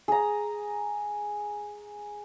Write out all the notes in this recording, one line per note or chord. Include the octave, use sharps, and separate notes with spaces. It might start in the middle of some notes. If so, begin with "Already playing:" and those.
G#4 A#5